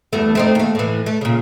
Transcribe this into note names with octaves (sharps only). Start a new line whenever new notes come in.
E2 G2 A3
A3 C4 D#4
D#2 A3
A2 E3
A3
A#2 C#3